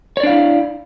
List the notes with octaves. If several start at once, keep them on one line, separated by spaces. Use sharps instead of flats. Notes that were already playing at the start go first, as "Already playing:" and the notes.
D4 E4 C#5 D5 F5